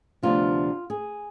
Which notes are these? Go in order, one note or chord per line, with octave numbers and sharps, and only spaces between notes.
D2 C3 F3 B3 D4 F4
G#4